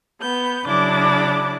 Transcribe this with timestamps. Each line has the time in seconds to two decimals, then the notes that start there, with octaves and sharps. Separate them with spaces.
0.19 B3 G6
0.65 C#3 F#3 D4 E4 D6